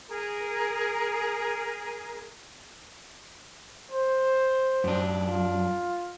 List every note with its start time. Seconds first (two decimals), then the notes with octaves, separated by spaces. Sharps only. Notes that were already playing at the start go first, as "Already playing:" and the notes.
0.07 G#4 A#4
3.92 C5
4.84 F#2 D4
5.27 F4